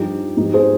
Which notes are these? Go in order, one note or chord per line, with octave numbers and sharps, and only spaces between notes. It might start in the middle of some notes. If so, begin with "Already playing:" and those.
Already playing: G2 F3 D#4 G4
G#2 F3 D#4 G4
G#4 C5